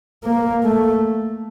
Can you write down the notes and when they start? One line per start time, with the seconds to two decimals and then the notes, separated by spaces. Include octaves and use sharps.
0.24 A#3
0.63 A3